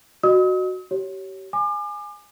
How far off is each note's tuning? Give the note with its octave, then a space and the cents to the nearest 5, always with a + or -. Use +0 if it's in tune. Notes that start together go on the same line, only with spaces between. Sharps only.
F#4 +0 D#5 -30 D#6 +45
G4 -35 C#5 +0
G#5 +0 D6 +40